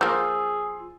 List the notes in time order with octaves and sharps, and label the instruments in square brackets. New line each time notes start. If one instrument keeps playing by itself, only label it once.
[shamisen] F3 A#3 [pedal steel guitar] F4 E6 G6 [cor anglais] G#4